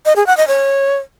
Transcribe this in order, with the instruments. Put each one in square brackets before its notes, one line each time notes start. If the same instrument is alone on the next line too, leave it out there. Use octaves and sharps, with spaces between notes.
[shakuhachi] D#5
G#4
F#5
D#5
C#5